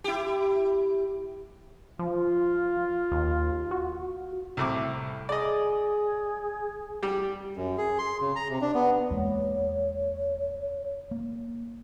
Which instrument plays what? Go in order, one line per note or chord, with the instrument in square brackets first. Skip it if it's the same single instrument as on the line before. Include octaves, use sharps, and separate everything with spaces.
[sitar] E4 G4
[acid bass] F3 [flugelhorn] F4
[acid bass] D#2
F#4
[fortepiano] C2 A2 D6
[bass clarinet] G#4 [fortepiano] D5 D#5
[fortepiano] G3 G4
[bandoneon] F#2
G#4
C6
C#3
A#5
C3
D4
B3
[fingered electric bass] E2 G#3 A#3 [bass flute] C#5
[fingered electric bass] A#3